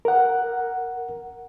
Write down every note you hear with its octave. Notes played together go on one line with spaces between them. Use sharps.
A#4 F#5